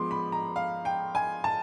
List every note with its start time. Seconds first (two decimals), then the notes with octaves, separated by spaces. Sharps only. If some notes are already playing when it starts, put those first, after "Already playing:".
Already playing: F3 G#3 B3 C6 D6
0.11 B5
0.32 A#5
0.56 F5
0.85 G5
1.15 G#5
1.44 A5